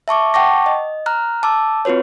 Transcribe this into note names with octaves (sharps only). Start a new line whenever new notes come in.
E5 A5 C#6 D6
F#5 G5 A5 C#6 D6 A#6
D#5
A#5 F6 F#6
A5 D6 E6
C4 F4 F#4 B4 C#5